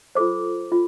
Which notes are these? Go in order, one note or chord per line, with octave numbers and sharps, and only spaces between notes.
F4 A4 C5 D6
F4